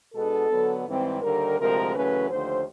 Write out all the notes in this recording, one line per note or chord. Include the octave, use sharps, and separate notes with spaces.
B2 G#3 B3 D4 A4
D3 F#3 B3 D4
G#2 E3 G3 C4
D#2 D3 G3 A#4
D2 C3 F3 G#3 A#4
F#2 C#3 E3 A3 C#4 B4
D#2 D3 F3 A3 C5